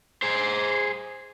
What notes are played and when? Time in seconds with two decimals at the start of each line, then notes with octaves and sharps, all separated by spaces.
0.22 G#4 C5